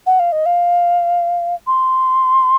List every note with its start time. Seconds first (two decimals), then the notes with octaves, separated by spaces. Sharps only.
0.06 F#5
0.19 F5
0.32 D#5
0.46 F5
1.67 C6